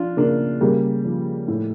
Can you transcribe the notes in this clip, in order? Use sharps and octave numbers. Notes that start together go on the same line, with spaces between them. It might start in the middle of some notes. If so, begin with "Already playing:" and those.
Already playing: F3 D4 F4
C#3 A#3 D4
C#3 G3 A#3
F3
A2